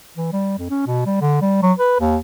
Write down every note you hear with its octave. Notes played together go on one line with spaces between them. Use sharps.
E3
G3
F2
C#4
B2
G3
D3
G3
F#3
B4
D#2